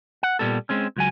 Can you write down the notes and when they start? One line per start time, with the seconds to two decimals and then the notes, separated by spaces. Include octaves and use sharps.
0.23 F#5
0.39 A#2 G3 B3 A4
0.69 G#3 C4 C#4
0.96 C#2 F#3 G#5